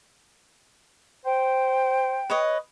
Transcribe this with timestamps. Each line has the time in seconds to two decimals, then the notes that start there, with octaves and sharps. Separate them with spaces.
1.25 C5 G5
2.30 B4 C#5 D#5